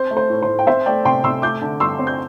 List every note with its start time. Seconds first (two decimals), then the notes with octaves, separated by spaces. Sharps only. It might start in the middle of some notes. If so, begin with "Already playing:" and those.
Already playing: C4 C5
0.11 A3
0.17 C5
0.30 A2
0.43 C5
0.48 A2
0.59 G5
0.67 C4 C5 E5
0.86 A3 D5 G5
1.05 C3 G5 C6
1.23 C3 C6 E6
1.42 A3 D6 G6
1.62 D3
1.80 G2 C6 E6
1.99 C4
2.07 G6